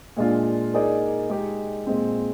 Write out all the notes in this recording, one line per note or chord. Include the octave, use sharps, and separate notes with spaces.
A#2 G#3 D4 F4
A#3 D#4 G#4 D5
G#3 D#4 G4
A#2 G#3 C4